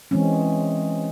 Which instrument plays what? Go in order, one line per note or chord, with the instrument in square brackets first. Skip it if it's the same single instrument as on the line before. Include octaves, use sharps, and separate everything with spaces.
[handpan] E3 G#3 C4 C#4